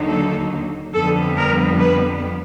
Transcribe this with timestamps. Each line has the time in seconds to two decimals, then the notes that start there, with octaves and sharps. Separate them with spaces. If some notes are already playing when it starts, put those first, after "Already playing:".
Already playing: D#2 D3 F#3 A#3 D#4
0.09 A4
0.94 F2 D3 G3 B3 A4
1.37 A#4
1.79 B4